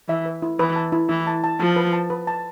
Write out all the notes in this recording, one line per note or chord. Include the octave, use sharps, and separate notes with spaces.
E3 E5
B4
E4
E3 B4
A5
E4
E3 E4
A5
A5
F3 A5
B4
A5
B4
A5